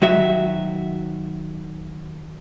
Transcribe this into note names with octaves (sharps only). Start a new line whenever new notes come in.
D#3 F#3 F#4 E5